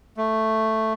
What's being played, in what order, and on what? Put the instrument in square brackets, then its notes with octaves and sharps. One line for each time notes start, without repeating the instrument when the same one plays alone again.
[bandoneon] A3